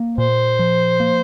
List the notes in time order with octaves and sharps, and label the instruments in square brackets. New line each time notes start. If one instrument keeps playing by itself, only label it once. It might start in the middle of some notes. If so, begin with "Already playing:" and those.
Already playing: [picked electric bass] A#3
[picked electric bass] A#2 [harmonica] C5
[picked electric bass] F3
A#3